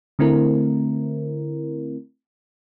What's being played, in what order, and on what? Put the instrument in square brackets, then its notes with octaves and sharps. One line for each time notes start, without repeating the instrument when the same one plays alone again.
[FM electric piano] D3 A3 C4 E4 A#4